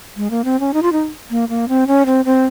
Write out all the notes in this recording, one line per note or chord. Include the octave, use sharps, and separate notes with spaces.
G#3
A#3
C4
C#4
D#4
F4
D#4
A#3
A#3
C4
C#4
C4
C4